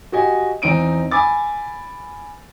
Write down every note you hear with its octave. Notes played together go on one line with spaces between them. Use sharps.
F#4 G4 D#5 G#5
E2 C4 D#4 D7 D#7
G#5 B5 D6 A6